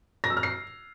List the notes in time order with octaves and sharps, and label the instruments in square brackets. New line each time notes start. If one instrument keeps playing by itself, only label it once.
[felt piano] A#6
E6
F6
C7